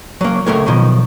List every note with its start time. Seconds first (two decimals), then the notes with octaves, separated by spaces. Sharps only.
0.21 F#3 A#3
0.46 C#2 A3 A#4 C#5
0.66 B2 D#3 F3 F#3